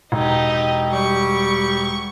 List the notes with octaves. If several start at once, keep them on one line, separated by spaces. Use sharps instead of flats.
E1 D#4 G4
G3 C#6